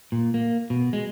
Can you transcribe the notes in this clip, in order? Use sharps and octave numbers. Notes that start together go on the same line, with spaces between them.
A#2
A#3
B2
G#3